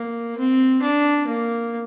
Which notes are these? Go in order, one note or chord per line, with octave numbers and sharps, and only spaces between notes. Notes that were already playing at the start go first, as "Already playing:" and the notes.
Already playing: A#3
C4
D4
A#3